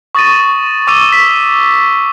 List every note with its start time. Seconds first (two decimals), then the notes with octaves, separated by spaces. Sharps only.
0.15 C#6 D#6 A6 A#6 D#7
0.87 C#6 D6 E6 D#7
1.12 B6